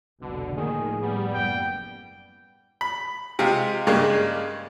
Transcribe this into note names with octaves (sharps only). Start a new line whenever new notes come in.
F1 C2 B2 D3
A2 D#3 F3 A#3 G#4
G3 B3
F#1 G5
B5
C3 G#3 F4
G2 C#3 G#3 A#3 D4